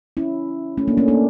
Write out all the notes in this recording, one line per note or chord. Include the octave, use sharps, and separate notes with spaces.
C#4 E4
A3 C#4
A#3 D4
A3 C#4
A#3 D4